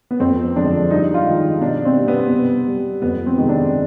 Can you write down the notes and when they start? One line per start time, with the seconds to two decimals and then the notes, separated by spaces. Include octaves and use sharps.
0.11 B3
0.20 F2 C4
0.56 D3 F3 G#3 D4
0.90 G2 D#4
1.14 F4
1.26 D#3 G#3
1.38 D#4
1.61 B2 D4
1.85 C4
1.97 G3
2.08 B3
2.32 C3
2.67 G3
3.02 F2 B3
3.26 C4
3.38 C3 D#3 G#3
3.49 D4